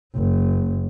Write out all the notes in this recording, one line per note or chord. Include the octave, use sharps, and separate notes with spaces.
F#1